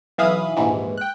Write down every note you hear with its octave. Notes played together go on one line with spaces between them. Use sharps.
B1 E3 E5 F5 B5 D#6
A#1 D#2 G#2 E3
G5 F#6